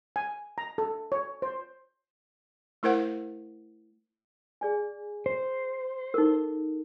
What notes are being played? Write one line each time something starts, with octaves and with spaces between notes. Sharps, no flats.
G#5
A#5
A4
C#5
C5
A3 E4 A#4 C5 F#5
G#4 D5 G#5
C5
D#4 A4 A#4